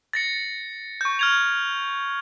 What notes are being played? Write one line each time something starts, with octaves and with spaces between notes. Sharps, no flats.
A6 A#6 C#7
C#6 G6
F6 G#6 F7